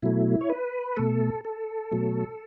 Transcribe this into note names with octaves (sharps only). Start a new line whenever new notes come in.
B2 F#3 A3 E4
C#5
B4
B2 A3 A4
A4
B2 F#3 A3